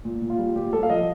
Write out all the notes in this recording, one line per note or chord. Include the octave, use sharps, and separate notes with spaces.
A#2
A#2
F4
G3
A#2 G4
A#2 A4
F5
F3 D#5